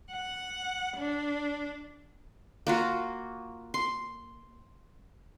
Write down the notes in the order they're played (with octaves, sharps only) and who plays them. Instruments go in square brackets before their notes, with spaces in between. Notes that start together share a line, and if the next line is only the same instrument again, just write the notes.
[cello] F#5
D4
[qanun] A#3 F4 F#4
C6